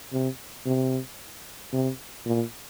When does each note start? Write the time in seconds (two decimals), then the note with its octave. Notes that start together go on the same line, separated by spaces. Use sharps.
0.12 C3
0.66 C3
1.73 C3
2.26 A#2